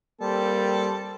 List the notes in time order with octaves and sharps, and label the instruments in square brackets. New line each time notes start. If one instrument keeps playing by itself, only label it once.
[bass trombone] G3 [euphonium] A#3 [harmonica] C4 A4